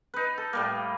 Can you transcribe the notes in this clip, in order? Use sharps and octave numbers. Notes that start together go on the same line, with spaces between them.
D#4 B4
A4
A2 G3 A#3